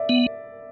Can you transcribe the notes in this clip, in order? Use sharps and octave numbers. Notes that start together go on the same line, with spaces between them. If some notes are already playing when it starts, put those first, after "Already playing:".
Already playing: D5 E5
B3